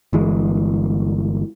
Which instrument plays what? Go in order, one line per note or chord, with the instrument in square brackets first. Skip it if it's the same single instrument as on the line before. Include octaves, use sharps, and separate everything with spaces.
[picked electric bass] G1 E3 G#3